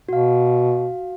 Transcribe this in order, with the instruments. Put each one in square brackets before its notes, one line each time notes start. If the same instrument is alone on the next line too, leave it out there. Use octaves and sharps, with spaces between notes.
[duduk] B2 [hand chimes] F#4 F5